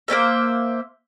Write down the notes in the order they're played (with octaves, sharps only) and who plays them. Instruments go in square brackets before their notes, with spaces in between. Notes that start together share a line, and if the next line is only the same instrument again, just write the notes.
[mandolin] A#3 C#4 C5 E5